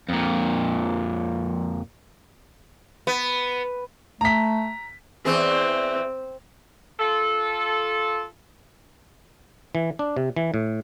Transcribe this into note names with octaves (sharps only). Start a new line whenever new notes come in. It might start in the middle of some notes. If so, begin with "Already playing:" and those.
F2 A#2
B3
A3 A#5 B6
E2 E3 C4 G#4
F4 A4
E3
D4
C3
E3
A2